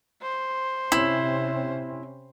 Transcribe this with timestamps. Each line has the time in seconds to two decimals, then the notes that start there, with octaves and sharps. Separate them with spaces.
0.22 C5
0.92 C3 C4 C#4 E4